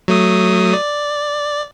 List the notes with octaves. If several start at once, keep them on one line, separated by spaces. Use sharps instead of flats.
F#3 A3 D#6
D5